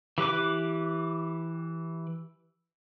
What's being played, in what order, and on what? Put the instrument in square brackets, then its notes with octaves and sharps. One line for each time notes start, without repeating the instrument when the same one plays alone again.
[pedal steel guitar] E3 G4 B4 D6